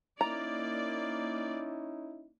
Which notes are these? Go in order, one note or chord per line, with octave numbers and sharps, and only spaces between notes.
A#3 C#4 D#4 E4 D5 A#5